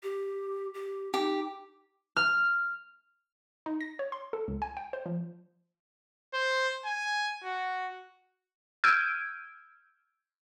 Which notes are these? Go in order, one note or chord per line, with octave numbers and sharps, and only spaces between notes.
G4
G4
D#4 G4
F6
D#4
A#6
C#5
C6
A4
C#2
G#5
G5
C5
F3
C5
G#5
F#4
E6 F6 G6 G#6 D7 D#7